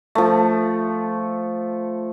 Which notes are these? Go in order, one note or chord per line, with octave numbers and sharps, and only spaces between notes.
F3 A3